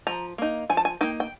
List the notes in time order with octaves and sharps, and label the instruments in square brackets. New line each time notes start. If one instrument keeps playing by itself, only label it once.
[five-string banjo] F3 A#5
A#3 D#4
F3 G#5
A5
G#5
A#3 D#4 G5
G5